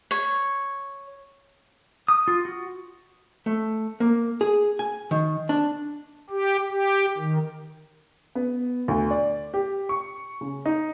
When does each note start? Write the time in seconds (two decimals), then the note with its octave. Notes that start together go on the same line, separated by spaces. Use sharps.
0.11 C#5
2.08 D#6
2.28 F4
2.45 F#4
3.46 A3
4.00 A#3
4.41 G#4
4.79 G#5
5.11 D#3
5.49 D4
6.30 G4
6.70 G4
7.18 D#3
8.35 B3
8.88 D2
9.11 D5
9.54 G4
9.89 C#6
10.41 C#3
10.65 D#4